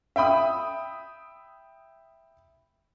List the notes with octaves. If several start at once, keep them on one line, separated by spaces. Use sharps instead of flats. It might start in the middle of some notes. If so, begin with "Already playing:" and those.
E5 G5 B5 D#6